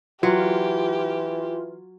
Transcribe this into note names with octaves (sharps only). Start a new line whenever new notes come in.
E3 F#3 F4 G4